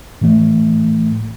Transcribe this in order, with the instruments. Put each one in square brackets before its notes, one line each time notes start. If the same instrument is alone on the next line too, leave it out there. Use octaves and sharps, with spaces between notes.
[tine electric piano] A2 E3 A3